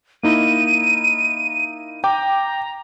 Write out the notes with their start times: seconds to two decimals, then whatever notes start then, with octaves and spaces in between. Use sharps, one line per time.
0.23 A#3 D#4 E4 D#7
2.04 G5 A#5 D6